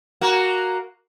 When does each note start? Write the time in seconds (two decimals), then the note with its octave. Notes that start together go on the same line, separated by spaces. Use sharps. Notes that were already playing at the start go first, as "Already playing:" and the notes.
0.21 A#3 F#4